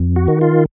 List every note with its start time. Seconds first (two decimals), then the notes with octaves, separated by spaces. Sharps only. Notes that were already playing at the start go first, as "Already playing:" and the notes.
Already playing: F2
0.16 F#4
0.28 D#3
0.41 F4